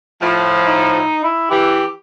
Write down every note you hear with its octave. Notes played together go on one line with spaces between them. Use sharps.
A2 F3
D#4
E4
E3 G4